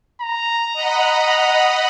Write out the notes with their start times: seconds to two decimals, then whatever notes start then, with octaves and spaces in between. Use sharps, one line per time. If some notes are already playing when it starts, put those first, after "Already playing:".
0.21 A#5
0.73 D#5 F#5 B5